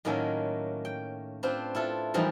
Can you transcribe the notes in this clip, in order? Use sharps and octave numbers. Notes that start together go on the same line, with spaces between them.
A2 D#3 F#3 A#3 C#4 A4
G5
C4 D4 F4 B4 C5
E4 F4 A4 B4
E3 F3 G3 G#3 A#3 D#4